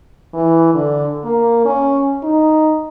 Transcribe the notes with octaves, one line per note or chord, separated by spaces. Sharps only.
E3
D3
A#3
C#4
D#4